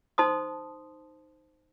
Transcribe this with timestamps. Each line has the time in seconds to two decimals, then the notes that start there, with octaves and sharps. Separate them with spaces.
0.18 D#4 C5 A5 C6 D#6